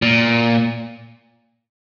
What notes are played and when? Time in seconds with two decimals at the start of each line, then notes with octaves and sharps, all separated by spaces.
0.02 A#2